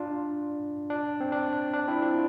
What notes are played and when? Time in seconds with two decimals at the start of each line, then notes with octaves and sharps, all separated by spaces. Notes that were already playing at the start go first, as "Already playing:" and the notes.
Already playing: D4 F4
0.90 D4
1.20 C4
1.32 D4
1.53 D4
1.74 D4
1.88 C4 E4
2.02 D4 F4